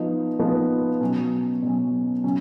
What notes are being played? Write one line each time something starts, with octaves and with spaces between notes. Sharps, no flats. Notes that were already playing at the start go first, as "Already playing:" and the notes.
Already playing: F3 B3 D#4
F3 B3 D#4
B2 F#3 C#4
B2 F#3 C#4
C#3 F#3 C#4